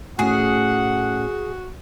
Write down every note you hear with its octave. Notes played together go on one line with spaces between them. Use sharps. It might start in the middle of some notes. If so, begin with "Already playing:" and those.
A2 A3 C#4 F#4 G#4 F#5